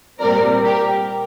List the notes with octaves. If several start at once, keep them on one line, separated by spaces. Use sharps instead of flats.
A#2 G3 C4 A#4 D5
G4 A#4